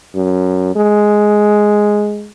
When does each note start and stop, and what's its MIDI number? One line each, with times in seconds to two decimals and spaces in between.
0.15 0.73 42
0.75 2.30 56